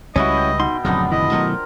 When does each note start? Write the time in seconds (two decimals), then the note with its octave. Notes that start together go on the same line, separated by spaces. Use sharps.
0.16 C#2 G3 C#4 E4 F#4 B4 D#5 E5
0.37 G5
0.60 B2 D#4 C6
0.85 D1 F2 C#3 F#3 B3 D4 D#4 F4
1.12 D#3 E4 D#5
1.32 B2 F#3 A3 A#4 C5 A#5